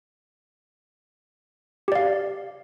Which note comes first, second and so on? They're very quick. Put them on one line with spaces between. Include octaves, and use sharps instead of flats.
G4 D5 F5